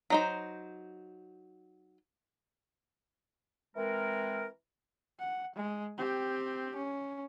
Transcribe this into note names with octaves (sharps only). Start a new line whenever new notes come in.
F#3 D#4 C5
E3 G#3 C4 A#4
F#5
G#3
C4 G4
C#4